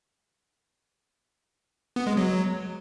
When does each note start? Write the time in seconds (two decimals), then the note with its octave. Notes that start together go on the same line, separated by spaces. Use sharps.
1.96 B3
2.07 G#3
2.17 F#3